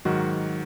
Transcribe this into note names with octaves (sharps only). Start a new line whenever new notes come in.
G#2 D#3 F#3 F#4